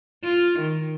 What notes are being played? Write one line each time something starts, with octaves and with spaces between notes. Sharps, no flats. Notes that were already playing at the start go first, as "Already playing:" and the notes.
F4
D#3